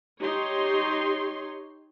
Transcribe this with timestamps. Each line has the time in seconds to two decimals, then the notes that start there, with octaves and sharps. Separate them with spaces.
0.21 D#4 G4 C#5 C6